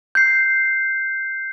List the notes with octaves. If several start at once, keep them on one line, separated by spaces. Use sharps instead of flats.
G6 C7